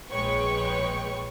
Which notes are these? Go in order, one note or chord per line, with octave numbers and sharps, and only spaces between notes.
A#1 G#3 B4 C#5 G5 C#6